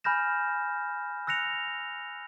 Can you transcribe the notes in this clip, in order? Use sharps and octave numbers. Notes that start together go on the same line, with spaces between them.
G#5 B5 F6 G6 A#6 E7
E6 F#6 A#6 C#7 F7